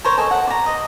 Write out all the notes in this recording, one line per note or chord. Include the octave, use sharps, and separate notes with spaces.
A#4 C5 C#5
A4 D#5 G#5
F#5
D5 A#5
D#5